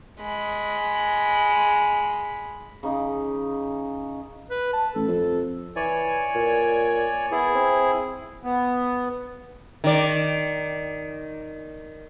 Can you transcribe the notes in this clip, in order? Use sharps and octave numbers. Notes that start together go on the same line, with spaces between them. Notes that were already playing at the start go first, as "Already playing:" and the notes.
G#3 B5
C#3 D#4 D#5 D6
B4
A5
A1 A4
F2
E3 C#5 D5 G#5
A#2
B3 E4 G#4
C4
B3
D#3 D5